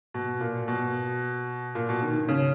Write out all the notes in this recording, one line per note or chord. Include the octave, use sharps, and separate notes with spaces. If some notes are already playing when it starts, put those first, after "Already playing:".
B2
A#2
B2
A#2
B2
D#3
D#3
C#3